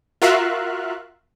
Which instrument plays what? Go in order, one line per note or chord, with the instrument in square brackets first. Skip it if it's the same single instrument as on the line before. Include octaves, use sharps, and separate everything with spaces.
[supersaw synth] F4 F#4 A#4 E5 F5 F#6